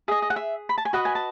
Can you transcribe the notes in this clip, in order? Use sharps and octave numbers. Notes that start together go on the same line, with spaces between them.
G#4 D#5 E5
D#5
F#5
E5
B5
A5
G#5
F#4 B4 D#5 F#5
G#5
A5